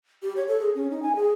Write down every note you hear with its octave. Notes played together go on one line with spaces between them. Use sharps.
G4
C#5
A4
G#4
C#4
D#4
G#5
G#4